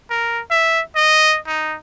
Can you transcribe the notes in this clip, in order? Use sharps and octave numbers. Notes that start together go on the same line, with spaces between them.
A#4
E5
D#5
D#4